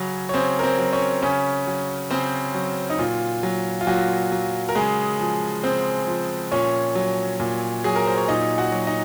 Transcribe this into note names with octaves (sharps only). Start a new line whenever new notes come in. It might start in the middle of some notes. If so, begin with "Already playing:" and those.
Already playing: C#3 F#3 C#4 C#5
C#5
C#3 C4 C5
A#4
C4 C5
F#3
C#4 C#5
C#3 C#4 C#5
F#3
C#3 C4 C5
F#3
D#4
A#2 F4
F#3
F4
A#2 F#3 F#4
F#3
A#4
C#3 G#3 G#4
F3
C#3 C4 C5
F3
A#2 C#4 C#5
F#3
A#2
F#3 G#4
A#4
C5
C#5
A#2 D#4 D#5
F#4 F#5
F#3
D#4 D#5